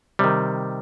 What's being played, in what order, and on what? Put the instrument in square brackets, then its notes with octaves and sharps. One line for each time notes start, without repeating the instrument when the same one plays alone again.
[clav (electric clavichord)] C3 D#3 G3